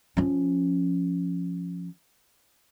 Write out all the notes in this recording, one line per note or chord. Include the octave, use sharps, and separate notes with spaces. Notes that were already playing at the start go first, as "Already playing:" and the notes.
F3 C#4